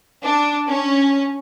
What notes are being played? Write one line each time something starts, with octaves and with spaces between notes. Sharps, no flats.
D4
C#4